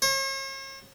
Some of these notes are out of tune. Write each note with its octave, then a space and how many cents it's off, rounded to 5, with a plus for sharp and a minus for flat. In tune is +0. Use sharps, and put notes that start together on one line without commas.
C#5 -45